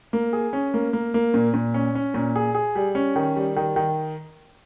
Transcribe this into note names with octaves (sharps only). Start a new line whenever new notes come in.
A#3
G#4
C#4
A#3
A#3
A#3
A#2
A#2
C#4
C#4
A#2
G#4
G#4
G3
C#4
D#3
G3
D#3
D#3